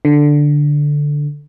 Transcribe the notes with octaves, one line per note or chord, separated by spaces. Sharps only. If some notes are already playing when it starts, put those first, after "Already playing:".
D3